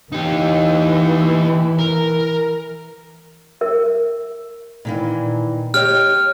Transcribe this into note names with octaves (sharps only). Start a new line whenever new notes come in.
E3 D#4 G4
A#4
A#4 E5
A#2 D#3 E3
G4 C#5 D#5 F6